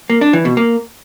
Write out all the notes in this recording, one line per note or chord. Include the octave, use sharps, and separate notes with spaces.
A#3
D4
E3
B2
A#3